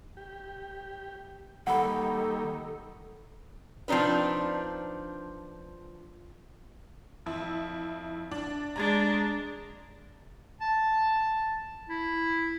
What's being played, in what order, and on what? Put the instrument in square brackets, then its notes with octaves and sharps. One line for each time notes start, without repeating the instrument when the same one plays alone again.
[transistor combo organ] G4
[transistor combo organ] D#3 G3 A#3 [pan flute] A4 [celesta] F#5 B5
[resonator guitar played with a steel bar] F3 C4 D4 D#4 B4
[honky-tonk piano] F2 E4
D4
[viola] G#3 D4 [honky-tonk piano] A#5 G#6 A6
[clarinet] A5
E4